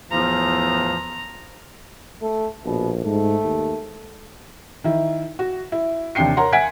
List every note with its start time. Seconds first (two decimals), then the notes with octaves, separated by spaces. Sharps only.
0.11 E2 A2 F3 A#5
2.22 A3
2.66 A#1 B2
3.05 G#2 A3
3.45 D#2
4.84 D#3 E4
5.39 F#4
5.72 E4
6.15 D#2 C3 D4 G5 C7 C#7
6.37 A#4 C#5 F#5 A#5 C6
6.53 E5 F#5 G#5 G#6 B6 D7